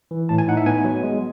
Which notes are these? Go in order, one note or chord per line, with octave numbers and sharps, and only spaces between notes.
E3
A2 A5
G#5
D#4 F#5
E5
B3 G#5
F#3
G#3